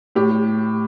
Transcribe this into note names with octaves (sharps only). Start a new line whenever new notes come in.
A2 G4